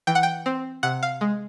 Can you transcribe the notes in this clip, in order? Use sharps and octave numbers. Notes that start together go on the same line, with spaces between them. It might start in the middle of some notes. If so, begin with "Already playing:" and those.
E3 G5
F#5
G5
C4
C3 F#5
F5
G#3